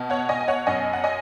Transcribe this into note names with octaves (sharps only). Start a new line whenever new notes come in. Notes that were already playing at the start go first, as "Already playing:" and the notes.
Already playing: B2
C#5 F#5
B2 D#5 G#5
G#5
C#5 F#5
F#2 D#5 G#5
F#5
D#5 G#5